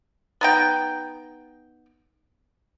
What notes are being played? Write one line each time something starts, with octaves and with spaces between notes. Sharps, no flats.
B3 D#4 G5